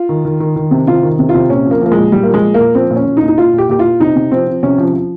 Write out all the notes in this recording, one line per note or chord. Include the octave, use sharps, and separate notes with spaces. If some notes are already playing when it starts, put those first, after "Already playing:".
Already playing: F4
D#3
D#3
D#3
D#3
C3
C3 F4
D#3
C3
F4
C3
A#2 C#4
F3
A#3
F3 A#3
G#3
A#2
A#2 G3
A#3
F3
G#3
A#2
A#3
A#2
F3 C4
A#2
C#4
A#2
D#4
A#2
D#4
A#2 F4
A#2
G4
A#2 G4
A#2 F4
C3 D#4
C3
F3 C4
F3
C3 C#4
F3
F3